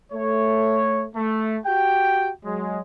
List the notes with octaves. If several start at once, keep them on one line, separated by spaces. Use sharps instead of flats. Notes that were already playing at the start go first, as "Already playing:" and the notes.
A3 C#5
A3
F#4 G4 G5
F#3 G#3